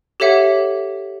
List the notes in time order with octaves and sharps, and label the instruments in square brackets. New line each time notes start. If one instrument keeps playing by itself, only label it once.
[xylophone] G4 A4 C#5 E5 F#5